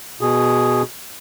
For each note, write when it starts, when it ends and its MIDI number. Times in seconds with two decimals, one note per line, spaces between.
0.21 0.82 47
0.21 0.82 68